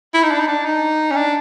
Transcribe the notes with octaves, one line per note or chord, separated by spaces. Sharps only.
E4
D#4
D4
D#4
D4
D#4
C#4
D4